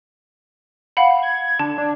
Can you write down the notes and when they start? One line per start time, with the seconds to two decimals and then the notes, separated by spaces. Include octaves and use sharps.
0.97 F5 F#5 B5
1.23 G#6
1.59 D3 A5
1.78 D4